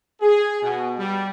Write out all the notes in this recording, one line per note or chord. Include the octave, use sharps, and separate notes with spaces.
G#4
B2
G3